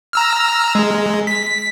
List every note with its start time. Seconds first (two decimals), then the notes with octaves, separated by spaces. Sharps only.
0.13 A#5 E6 F6
0.75 G#3
1.27 B6